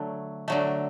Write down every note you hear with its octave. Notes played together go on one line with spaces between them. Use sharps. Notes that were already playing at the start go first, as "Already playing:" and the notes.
Already playing: D3 F#3 A3
D3 F#3 A3